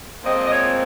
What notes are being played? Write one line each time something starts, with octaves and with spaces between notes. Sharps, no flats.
A#2 F3 G#3 C4 D#5
D#5
C#5